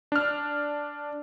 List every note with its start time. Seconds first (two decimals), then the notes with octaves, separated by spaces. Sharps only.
0.12 D4 F6